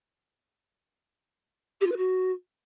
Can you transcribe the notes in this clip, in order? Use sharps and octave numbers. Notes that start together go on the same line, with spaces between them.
G4
F4
B4
F#4